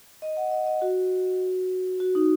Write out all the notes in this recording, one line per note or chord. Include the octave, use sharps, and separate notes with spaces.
D#5
F#5
D#5
D#5
F#4
F#4
D#4